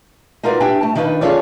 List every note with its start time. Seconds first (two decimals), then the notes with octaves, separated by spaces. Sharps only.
0.43 D#4 F4 F#4 A#4 B4 D5
0.60 D4 E4 G4 G5 G#5
0.81 A3 A5
0.95 D#3 D4 D#4 F4 B4
1.21 C#4 F4 G#4 A4 C#5 D5